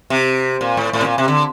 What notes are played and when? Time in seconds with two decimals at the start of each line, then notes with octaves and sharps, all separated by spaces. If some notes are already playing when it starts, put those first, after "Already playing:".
0.10 C3
0.61 A#2
0.77 A2
0.93 A2
1.01 C3
1.05 A#2
1.18 C3
1.28 D3